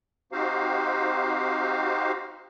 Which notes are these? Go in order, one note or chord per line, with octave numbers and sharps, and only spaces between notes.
C4 D#4 F#4 G4 C5 F5